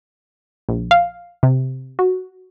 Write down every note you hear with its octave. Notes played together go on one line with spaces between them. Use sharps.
A#1
F5
C3
F#4